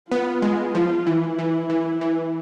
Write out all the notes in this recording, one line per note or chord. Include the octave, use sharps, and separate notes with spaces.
B3 F4
G#3
F3 F4
E3 E4
E3
E3
E3